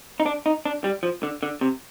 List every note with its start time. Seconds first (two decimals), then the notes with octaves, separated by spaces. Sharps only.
0.20 D#4
0.26 D4
0.46 D#4
0.65 D4
0.84 G3
1.03 F3
1.23 D3
1.43 D3
1.61 C3